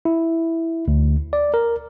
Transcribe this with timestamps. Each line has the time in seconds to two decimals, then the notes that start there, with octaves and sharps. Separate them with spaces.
0.05 E4
0.88 D2
1.33 D5
1.54 A#4